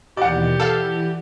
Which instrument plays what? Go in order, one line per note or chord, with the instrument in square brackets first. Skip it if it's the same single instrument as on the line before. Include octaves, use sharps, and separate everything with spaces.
[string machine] D#2 B2 E3 [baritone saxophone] G4 [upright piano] D5 F#5
[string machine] E3 [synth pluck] A4 F5